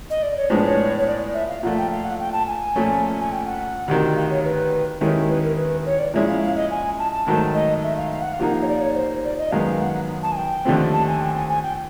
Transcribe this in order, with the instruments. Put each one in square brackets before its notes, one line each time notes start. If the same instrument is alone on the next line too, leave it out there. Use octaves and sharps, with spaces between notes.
[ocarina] D#5
D5
C#5
[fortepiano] A2 F3 G#3 B3 D4 [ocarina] C5
[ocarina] C#5
C#5
D5
E5
F5
[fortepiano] A#2 F3 A3 [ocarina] F#5
[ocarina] G5
F5
F#5
G5
A5
G#5
[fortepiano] A#2 F3 A3 C#4
[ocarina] G#5
G5
F#5
[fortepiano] D2 C3 D#3
[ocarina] F5
C#5
B4
[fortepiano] D#2 D#3 G#3 C#4 E4 [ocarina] A#4
[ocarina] B4
A#4
B4
C#5
D5
[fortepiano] A#2 F3 G#3 C#4 E4 [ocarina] E5
[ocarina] F5
F5
D#5
G#5
A5
A5
[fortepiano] G#2 D#3 F#3 A3
[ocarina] D#5
E5
F5
F5
F#5
F5
[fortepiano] C3 F3 A#3 D#4 [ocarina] F#5
[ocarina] F5
C#5
D5
C#5
C5
D5
D#5
[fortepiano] F#2 D#3 G#3 B3 [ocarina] F5
[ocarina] F#5
A5
G#5
G5
[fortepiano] D#2 D3 F3 A3 C4
[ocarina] A5
G#5
G5
G#5
G#5
G5